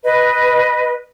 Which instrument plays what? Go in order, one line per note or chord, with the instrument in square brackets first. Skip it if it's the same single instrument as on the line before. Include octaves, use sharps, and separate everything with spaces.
[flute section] B4 D#5